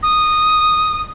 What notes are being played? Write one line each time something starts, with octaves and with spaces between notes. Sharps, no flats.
D#6